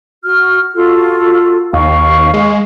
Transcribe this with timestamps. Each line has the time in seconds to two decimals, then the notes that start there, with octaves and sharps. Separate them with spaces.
0.24 F#4 F6
0.75 F4 F#4 A4
1.73 D#2 F5 C#6
2.34 G#3